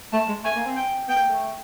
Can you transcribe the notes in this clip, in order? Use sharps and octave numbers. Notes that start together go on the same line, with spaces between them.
A3 A5
G#3
A3 G#5
A#3
C4
G5
B3 G5
A#3
A3